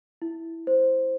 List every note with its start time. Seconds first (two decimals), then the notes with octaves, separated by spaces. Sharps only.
0.22 E4
0.67 C5